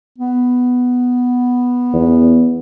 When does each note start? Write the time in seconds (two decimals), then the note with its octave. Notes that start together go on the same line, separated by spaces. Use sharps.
0.18 B3
1.93 E2